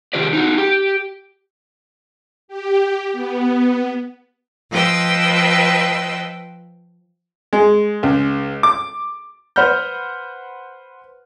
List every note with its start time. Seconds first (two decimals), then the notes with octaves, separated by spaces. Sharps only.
0.13 C3 D#3 F4 G4 C5 D5
0.33 D#4 F4 F#4
0.58 G4
2.48 G4
3.12 B3
4.71 F3 B4 D#5 G5 C6 E6
7.53 G#3
8.03 C#2
8.63 D6
9.56 B4 C5 F#5 B5 F6 G6